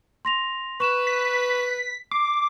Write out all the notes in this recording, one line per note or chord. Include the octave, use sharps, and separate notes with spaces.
C6 A#6 F7
B4 C#6 E7
B6
D6 C7